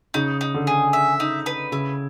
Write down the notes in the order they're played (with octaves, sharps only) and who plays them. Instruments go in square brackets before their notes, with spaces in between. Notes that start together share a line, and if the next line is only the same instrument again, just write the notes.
[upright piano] C#3 [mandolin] D#4
[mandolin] D#4
[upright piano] D3
[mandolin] G#4
E5
D#4
B4
[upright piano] C#3 [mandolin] E4